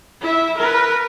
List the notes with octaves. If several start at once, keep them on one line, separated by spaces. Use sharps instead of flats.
E4 E5
A#4 B4